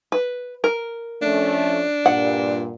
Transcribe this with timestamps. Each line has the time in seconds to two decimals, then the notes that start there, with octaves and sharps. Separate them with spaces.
0.12 B4
0.64 A#4
1.22 F3 A3 C#4 D4
2.06 G2 A#2 F#5